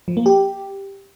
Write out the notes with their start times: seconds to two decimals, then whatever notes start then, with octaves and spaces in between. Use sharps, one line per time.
0.08 F3
0.17 A#3
0.26 G4